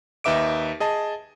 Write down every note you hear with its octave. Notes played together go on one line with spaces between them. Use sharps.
D#2 D#4 B4 E5 D6 D7
G#4 D#5 A5